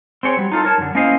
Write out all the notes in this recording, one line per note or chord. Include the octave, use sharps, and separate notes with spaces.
C4 G#4 C#5
F#3 G3
D#4 F4 A4
A#4 C#5 A5
F#2 D3
A#3 C#4 E4 C5 D#5 F5